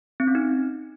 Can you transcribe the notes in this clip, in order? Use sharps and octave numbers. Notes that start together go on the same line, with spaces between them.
C4
C#4
D#4